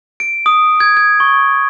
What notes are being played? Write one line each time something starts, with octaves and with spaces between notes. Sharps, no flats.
D7
D#6
G#6
G#6
C#6